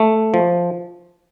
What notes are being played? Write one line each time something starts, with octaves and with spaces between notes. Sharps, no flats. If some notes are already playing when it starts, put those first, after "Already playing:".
Already playing: A3
F3